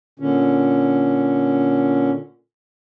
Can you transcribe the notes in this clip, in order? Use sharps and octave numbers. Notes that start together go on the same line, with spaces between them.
A#2 D3 C#4